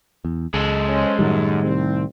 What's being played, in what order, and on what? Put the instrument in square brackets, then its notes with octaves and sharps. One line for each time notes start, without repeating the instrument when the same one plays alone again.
[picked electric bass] E2
[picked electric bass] C#2 [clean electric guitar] G#3 G#4 A4
[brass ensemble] C#4 C5 D#5
[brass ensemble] F#2 [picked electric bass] A2 D#3 G3
[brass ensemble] C2 C4